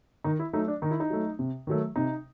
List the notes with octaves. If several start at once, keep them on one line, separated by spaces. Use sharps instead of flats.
D#3 D#4
E4
F#3 A3 D#4
D4
D#3 D#4
E4
D#4
F#3 A3
C3
D#3 F#3 A3
C3 D#4